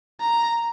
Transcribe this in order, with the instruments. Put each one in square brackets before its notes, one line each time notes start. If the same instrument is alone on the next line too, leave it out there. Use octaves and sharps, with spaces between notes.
[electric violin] A#5